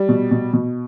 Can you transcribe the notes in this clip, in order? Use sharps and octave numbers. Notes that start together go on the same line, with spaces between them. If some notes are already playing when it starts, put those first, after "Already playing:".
Already playing: G3
B2
B2
B2